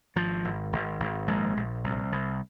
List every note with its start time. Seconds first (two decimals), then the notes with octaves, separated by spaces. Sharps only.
0.16 G#1 F3
0.45 G#1
0.73 G#1
1.00 G#1
1.28 A#1 G#3
1.57 A#1
1.84 C2
2.12 C2